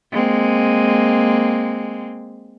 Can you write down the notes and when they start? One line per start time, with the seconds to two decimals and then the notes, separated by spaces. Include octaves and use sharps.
0.12 G#3 A#3 C4